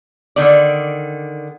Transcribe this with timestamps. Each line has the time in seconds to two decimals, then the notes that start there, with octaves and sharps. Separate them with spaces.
0.36 D3 D#3 D5